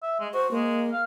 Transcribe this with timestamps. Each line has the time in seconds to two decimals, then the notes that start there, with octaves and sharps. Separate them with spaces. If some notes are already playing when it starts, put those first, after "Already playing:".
0.03 E5
0.20 G#3
0.34 F#4 C5
0.51 G#3 A#3
0.92 F5